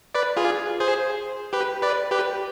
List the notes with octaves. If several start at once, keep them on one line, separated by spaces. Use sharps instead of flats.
B4 D5
F4 G#4
G#4 C5
G4 B4
B4 D5
G4 B4